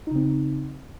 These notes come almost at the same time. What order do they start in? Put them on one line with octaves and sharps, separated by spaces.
D#4 C#3 C4